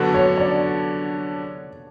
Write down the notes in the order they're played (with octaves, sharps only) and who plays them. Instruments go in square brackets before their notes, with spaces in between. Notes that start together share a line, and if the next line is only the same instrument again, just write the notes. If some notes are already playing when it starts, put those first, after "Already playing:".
Already playing: [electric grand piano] D3 F#3 B3 D4 F#4 [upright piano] A4
[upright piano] C#5
D5